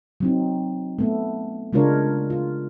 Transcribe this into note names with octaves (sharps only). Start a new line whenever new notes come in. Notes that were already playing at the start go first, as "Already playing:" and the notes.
F#3 C4 D#4
A3 B3
C#3 G#3 D4 F4 A#4 C#5
F4